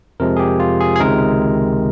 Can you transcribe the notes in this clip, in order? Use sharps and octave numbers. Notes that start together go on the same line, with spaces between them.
F2 C3 F3 G#3 A#4
G#4
G4
F4
G#4
G#4
C#2 C3 D#3 G#3 A#4